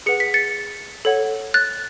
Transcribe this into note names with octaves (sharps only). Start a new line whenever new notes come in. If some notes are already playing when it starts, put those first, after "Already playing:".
G#4 B4 F#5 C#7
B6
A6 C#7
A4 C#5 F#5
F#6 A6